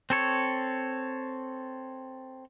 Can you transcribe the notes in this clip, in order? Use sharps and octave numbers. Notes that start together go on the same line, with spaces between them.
C4 A4 C#5